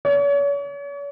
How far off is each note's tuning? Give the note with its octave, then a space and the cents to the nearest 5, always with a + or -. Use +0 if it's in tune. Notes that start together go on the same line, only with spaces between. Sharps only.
C#5 +40